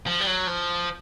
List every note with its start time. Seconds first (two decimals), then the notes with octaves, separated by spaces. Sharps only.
0.07 F3
0.20 G3
0.27 F#3
0.47 F3